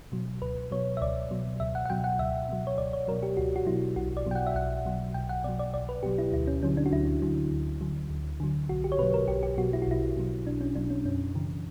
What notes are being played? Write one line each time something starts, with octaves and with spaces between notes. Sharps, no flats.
B2 F#3
C#2 B4
B2 F#3 C#5
E5
C#2 D5
B2 F#3
C#2 E5
F#5
F#5
B2 F#3 G5
F#5
C#2 E5
B2 F#3
C#5
C#2 D5
C#5
B2 F#3 A#4
G4
C#2 F#4
F#4
B2 F#3 E4
B1 F#4
D5
B2 F#3 G5
F#5
E5
B1 F#5
B2 F#3
B1 G5
F#5
B2 F#3 D5
D5
B1 D5
B4
B2 F#3 G4
E4
D2 E4
C#4
D3 F#3 C#4
D4
F#4
D2 E4
D3 F#3
D2
D3 F#3
D2
D3 F#3
B1 F#4
G4
C#5
B2 F#3 B4
A#4
B1 G4
G4
B2 F#3 F#4
E4
F#4
B1 E4
B2 F#3
B1 D4
C#4
B2 F#3 D4
C#4
F#2 C#4
C#3 E3